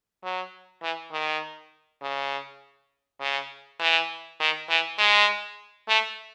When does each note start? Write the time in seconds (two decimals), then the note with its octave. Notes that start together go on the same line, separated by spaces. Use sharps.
0.23 F#3
0.82 E3
1.12 D#3
2.02 C#3
3.20 C#3
3.79 E3
4.40 D#3
4.69 E3
4.99 G#3
5.88 A3